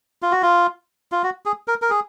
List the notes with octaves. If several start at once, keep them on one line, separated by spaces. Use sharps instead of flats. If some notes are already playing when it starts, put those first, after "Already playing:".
F4
F#4
F4
F4
F#4
G#4
A#4
A#4
G#4